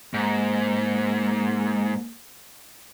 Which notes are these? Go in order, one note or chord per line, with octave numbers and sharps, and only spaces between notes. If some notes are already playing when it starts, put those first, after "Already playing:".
G#2 A#3